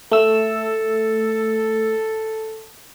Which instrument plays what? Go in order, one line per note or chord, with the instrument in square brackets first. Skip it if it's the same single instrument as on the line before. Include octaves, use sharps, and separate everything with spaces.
[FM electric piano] A3 E6 [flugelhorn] A4